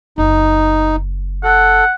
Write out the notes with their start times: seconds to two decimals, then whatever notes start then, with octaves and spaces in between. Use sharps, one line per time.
0.18 F#1 D#4
1.44 A4 F#5